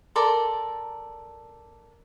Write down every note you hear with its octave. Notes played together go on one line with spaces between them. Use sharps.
A4 A#4 D5 C6